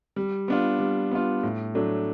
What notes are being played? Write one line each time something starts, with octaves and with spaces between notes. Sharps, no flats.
G3
B3 D4 F4
G3
B3 D4 F4
A2
F#3 A3 D4